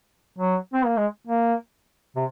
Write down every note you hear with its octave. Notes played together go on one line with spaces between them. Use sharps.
F#3
C4
A#3
G#3
A#3
C3